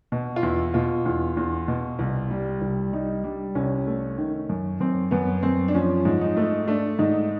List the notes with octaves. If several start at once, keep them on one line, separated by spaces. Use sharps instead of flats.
B2
F4
E2 E4
B2 F4
E2
E2
B2
C2
G3
C2
G3 D#4
G3 D4
C2 C#4
A3
D#3
F#2
F#2 C4
F#2 B3
F#2 C4
D4
F3 C#4
G#2
D#4
A3
A3 D4
G#2 D#4